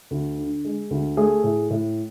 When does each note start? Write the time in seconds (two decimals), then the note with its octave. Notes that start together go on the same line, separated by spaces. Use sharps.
0.11 D2
0.38 D3
0.65 G#3
0.91 D2
1.17 A3 G#4
1.44 A2
1.70 A2